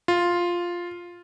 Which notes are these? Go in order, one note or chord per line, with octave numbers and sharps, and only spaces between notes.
F4